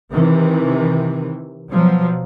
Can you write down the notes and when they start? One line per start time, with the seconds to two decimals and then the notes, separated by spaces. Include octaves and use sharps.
0.13 C3 D#3 E3
1.71 B2 F3 F#3